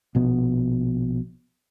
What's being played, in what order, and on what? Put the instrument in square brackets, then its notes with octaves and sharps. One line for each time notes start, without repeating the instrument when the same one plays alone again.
[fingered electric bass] A#1 B2 B3